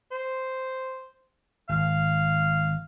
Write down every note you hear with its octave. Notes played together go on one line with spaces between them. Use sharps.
C5
G#1 F5